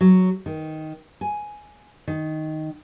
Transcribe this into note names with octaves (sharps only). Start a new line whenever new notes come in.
F#3
D#3
G#5
D#3